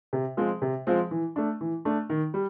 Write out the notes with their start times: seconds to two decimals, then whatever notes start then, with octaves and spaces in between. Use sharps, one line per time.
0.13 C3
0.37 F3 G#3 C4
0.62 C3
0.87 F3 G#3 C4
1.11 E3
1.36 A3 D4
1.61 E3
1.85 A3 D4
2.09 D#3
2.34 G3